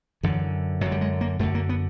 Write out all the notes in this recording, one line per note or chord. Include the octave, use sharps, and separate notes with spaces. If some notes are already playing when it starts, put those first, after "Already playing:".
F#2 D3 E3
F#2 D3 F#3
G3
G#3
A#3
F#2 D3 A3
A#3
B3